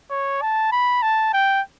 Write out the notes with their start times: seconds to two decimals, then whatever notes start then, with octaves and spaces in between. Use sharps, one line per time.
0.11 C#5
0.42 A5
0.72 B5
1.02 A5
1.33 G5